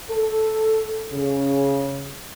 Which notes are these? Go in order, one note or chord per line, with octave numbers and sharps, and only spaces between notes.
A4
C#3